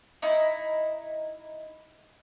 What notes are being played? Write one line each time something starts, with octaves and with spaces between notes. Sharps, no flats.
D#4 E4